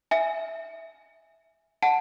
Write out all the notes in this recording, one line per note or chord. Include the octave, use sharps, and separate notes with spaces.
E5 G#5
F#5 A5